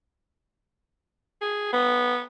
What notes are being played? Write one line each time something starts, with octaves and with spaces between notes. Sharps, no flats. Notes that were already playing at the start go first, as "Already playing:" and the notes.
G#4
B3